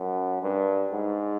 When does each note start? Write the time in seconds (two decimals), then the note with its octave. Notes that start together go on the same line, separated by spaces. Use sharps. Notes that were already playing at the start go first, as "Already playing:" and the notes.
Already playing: F#2
0.42 G2
0.92 G#2